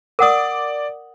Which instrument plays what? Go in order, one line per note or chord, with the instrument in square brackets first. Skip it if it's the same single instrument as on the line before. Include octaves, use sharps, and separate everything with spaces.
[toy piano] A#4 F#5 D#6 [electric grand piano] D5 D6